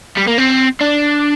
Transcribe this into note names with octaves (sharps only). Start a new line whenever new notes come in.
G3
A#3
C4
D4